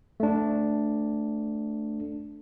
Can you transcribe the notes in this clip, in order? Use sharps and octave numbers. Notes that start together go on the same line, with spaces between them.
A3 D4